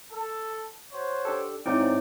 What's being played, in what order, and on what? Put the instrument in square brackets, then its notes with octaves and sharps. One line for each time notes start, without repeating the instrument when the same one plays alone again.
[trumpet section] A4
F#4 C5 C#5
[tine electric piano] D4 G4 A4
[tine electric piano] G#2 D#4 G5 [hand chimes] C4 E4 C#5 [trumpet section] D5